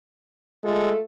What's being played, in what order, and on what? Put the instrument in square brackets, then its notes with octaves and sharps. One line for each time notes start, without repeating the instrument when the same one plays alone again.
[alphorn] G#3 [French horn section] A3 F4 A4